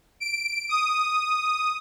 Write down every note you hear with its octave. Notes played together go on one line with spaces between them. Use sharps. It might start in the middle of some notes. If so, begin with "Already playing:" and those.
D7
D#6